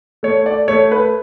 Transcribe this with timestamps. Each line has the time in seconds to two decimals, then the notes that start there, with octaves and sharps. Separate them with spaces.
0.23 A3 C#5
0.46 D5
0.68 A3 C#5
0.91 B4